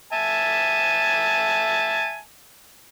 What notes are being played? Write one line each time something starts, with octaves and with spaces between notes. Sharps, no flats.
E5 G#5 A5